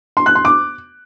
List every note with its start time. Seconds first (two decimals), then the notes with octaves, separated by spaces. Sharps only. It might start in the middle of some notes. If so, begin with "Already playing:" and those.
0.17 C6
0.26 F#6
0.35 C6
0.45 D6